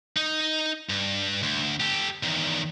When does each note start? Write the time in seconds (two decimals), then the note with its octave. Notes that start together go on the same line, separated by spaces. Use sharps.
0.17 D#4
0.89 G2
1.43 D2
1.80 G4 A4
2.23 E2 D#3